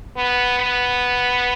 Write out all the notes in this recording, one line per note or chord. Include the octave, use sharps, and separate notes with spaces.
B3
B3